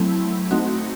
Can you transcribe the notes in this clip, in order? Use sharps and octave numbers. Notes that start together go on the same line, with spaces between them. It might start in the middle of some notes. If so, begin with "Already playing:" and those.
Already playing: F#3 A3 C4 E4
A3 C4 D#4 F#4